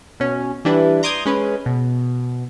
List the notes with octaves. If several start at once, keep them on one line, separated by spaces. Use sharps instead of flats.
B2 C#4
E3 G3 D4 E4 B4
A#5 C6 D6 D#6 G6 G#6
G#3 C#4 B4
B2